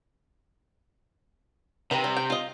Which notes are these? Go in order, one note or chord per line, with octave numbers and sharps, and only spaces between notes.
C3 D#3 B4 A#5
G3
G5
F4 D#5